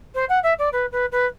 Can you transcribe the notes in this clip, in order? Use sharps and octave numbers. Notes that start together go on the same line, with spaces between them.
C5
F#5
E5
D5
B4
B4
B4